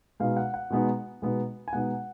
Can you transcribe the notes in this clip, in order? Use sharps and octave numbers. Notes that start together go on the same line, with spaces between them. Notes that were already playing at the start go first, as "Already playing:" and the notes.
B2 G#3 B3 D#4 F5
F#5
F#5
B2 G#3 B3 D#4
B2 G#3 B3 D#4
G#5
B2 G#3 B3 D#4 F#5